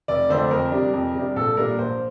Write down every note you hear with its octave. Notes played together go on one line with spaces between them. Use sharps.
F1 D5
F2 D3 A3 D4 C5
F2 A#4
C3 G3 D4
F2
C3 G3 D4
A#1 A4
A#2 G3 D4 A#4
A#1 C5